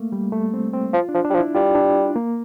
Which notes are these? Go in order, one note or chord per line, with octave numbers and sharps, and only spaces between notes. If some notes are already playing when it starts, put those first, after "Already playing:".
Already playing: A3 A#3
G3
A3
C4
C4
F3 F4
D4
F3
D4
G3
F3
E4
G3 F4
D4
A#3